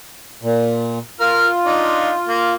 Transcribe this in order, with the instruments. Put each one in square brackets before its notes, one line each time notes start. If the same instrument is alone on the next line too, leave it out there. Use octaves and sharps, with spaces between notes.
[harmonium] A#2
[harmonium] F4 [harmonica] A#4 F6
[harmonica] D4 D#4
A#3